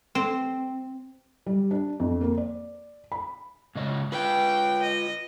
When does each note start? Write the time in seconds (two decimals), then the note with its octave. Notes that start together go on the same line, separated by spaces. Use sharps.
0.15 C4
1.46 G3
1.71 D4
2.00 F2
2.21 A#3
2.37 D5
3.12 B5
3.75 G#2 C#3 D#5
4.12 F4 B4 G5
4.82 D#5